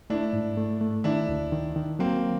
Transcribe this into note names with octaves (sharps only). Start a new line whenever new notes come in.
A3 D4 E4
G#2
A3
A3
D#3 D4 E4
D2
D#3
D#3
F#3 A#3 C4